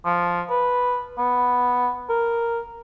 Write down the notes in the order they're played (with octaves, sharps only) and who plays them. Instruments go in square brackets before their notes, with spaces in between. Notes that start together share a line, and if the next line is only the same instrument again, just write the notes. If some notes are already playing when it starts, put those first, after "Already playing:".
[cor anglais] F3
B4
B3
A#4